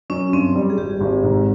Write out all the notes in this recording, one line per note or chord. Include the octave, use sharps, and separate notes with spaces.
F#2 C#4
G2 C4
G3
G#4
G#1 G4
G#1
G#2